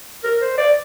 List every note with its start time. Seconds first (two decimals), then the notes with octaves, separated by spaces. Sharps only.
0.24 A#4
0.42 C5
0.58 D5